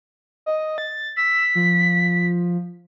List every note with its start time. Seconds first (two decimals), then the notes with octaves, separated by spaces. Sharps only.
0.46 D#5
0.78 A6
1.17 E6 B6
1.55 F3